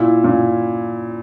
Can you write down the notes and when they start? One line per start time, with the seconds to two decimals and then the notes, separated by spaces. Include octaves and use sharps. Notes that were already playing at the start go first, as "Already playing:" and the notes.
Already playing: A#2 E4
0.24 A#2